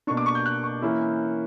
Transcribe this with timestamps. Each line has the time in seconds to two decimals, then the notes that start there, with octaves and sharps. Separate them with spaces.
0.07 B2 A#3 D4 C#6
0.17 D6
0.26 C#6
0.35 G6
0.46 F#6
0.63 C#6
0.82 E3 A#3 C#4 E4